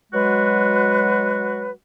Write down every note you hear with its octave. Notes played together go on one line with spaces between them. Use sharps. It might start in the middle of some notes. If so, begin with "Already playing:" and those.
F#3 G#3 F#4 B4